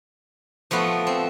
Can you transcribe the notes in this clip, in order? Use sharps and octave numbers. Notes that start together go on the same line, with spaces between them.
F3 A3 B3 F#4
C4